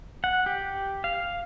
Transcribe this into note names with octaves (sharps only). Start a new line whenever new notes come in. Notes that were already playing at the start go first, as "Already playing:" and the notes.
F#5
G4
F5